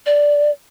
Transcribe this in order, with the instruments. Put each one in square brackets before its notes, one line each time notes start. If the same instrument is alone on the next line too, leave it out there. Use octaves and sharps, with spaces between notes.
[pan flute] D5